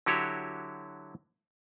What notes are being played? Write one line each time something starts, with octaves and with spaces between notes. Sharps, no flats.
D3 F#3 E4 F#4 G4 C#5